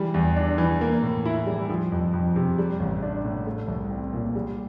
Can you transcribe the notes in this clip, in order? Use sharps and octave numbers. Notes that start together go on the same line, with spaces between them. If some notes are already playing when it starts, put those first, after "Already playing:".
Already playing: E3 G3
E2
D4
E3
A#3
A2
E4
G3
F3
F2
F2
C3
G3
A1
D4
A2
A3
C2
C4
A#2
G3